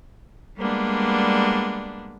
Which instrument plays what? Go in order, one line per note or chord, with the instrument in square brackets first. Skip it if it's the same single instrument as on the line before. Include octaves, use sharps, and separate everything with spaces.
[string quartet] G3 G#3 A#3 B3 D4